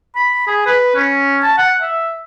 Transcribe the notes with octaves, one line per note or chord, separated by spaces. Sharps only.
B5
G#4
B4
C#4
A5
F#5
E5